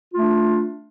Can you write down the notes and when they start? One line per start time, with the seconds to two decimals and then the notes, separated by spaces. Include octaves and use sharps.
0.13 F4
0.16 A3
0.19 D4